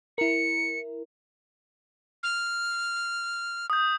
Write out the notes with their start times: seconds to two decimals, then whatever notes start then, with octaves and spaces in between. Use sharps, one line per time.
0.18 E4 A#4 C#7
2.23 F6
3.70 D#6 G6